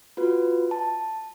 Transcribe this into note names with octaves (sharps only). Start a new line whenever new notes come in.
F4 F#4 B4
A5